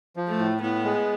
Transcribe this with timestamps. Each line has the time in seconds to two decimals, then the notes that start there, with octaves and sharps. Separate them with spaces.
0.16 F3
0.28 A3
0.39 A2
0.61 A2 B3
0.84 G#3